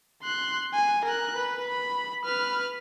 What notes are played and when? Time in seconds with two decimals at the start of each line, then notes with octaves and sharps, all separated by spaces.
0.23 C6 F#6
0.74 G#5
1.05 A#4 F#6
1.37 B4
1.67 B5
2.25 B4 F6